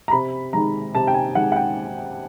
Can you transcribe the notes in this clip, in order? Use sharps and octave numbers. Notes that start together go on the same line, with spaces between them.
A#5
C3 B5
D#3 G#3 A#5
C3 A5
G5
G#5
D#3 G#3 F#5
F#5
G5